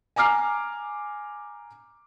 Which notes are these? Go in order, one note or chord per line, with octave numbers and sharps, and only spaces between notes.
G#5 A#5 D6 F6 C7